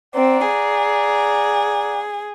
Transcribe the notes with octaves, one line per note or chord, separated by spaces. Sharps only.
C4 D5 F#5 A#5
G#4